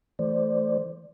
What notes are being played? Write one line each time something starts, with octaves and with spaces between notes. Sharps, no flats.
E3 A3 C5 D5